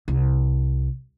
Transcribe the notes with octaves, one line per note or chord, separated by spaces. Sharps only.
C2